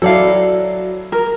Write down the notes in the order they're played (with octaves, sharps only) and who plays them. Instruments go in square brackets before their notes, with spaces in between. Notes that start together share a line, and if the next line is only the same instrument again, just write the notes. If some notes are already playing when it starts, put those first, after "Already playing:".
[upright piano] F#3 E4 [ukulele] A4 D5 F5
[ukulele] A#4